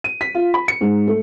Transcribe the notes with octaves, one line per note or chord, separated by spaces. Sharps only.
D#7
B6
F4
B5
C#7
G#2
A3